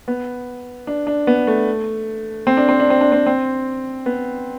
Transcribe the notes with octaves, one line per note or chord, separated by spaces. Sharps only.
B3
D4
D4
B3
A3
C4
D4
C4
D4
C4
D4
C4
C4
B3